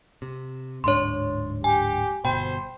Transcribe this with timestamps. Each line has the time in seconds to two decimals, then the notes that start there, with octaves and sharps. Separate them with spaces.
0.22 C3
0.84 D1 G#2 D4 C#5 C6
1.64 G4 G#5
2.25 G1 B2 C5 G5 B5